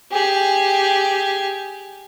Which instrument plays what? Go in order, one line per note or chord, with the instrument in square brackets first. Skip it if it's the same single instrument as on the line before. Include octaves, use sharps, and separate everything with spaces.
[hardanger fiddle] G4 G#4